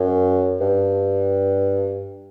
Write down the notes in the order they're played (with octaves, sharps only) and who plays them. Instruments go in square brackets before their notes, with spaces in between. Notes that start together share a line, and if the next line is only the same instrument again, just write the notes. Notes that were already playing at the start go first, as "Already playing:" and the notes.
Already playing: [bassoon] F#2
G2